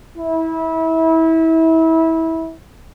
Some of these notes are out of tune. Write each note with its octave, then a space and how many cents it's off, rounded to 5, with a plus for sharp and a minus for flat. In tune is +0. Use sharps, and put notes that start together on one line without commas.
E4 -25